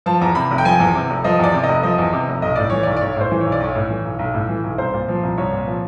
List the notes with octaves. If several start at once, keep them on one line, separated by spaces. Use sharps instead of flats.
F3 A5
E2 A#5
C3 B5
F1
G5
F3 G#5
E2
C3
F1
F3 D#5
E2 D5
C3
D5
D#5
F1
F3 D#5
E2
C3
F1
B1 D#5
A2 D5
E3 C#5
B1 D5
D5
B1 C#5
A2 C5
E3
C#5
B1
D5
B1 C#5
A2
E3
B1
B1
A2
E3
B1
C2 C5
A#2
F3
C2
C2 C#5
A#2
F3